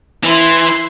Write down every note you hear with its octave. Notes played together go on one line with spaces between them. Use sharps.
E3 E4 C6